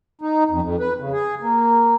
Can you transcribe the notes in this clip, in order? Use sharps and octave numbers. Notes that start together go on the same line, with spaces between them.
D#4
F2
F2
B4
C#3
G#4
A#3